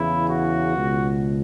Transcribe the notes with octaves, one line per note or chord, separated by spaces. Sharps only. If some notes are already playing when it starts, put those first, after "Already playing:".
Already playing: E2 C#3 E3 E4
F#4
C#2 B2